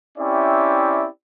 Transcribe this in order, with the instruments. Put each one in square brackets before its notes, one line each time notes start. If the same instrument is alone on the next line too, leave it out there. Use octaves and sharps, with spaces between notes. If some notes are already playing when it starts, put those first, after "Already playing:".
[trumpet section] C4 C#4 E4 G4 D5 E5